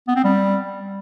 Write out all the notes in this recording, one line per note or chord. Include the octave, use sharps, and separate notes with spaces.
B3
C4
G3